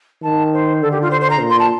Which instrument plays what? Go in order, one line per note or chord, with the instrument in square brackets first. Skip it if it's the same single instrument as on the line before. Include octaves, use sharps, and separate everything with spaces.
[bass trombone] D#3 [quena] A5
[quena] C5
[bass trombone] D3 [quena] A4
[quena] G4
F4
C5
C5
A#5
[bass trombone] A#2
[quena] C6
A5